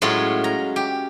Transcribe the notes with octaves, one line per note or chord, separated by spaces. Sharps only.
A2 F#3 G#3 C#4 F4
A#5
G4